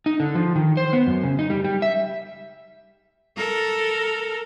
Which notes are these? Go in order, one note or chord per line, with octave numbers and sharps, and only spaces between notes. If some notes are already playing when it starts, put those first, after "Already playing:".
D#4
D3
F3
D#3
C5
B3
F#2
C#3
D#4
G3
G3
E5
A4 A#4